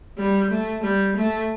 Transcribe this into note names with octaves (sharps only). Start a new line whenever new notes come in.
G3
A3
G3
A3